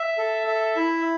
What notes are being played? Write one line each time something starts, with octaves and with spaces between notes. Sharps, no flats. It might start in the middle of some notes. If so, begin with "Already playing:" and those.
Already playing: E5
A4
E5
E4